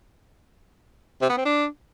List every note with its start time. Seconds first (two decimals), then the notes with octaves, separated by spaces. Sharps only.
1.21 C3
1.29 B3
1.37 C4
1.45 D4